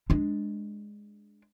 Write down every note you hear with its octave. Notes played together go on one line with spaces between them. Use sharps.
G#3 D4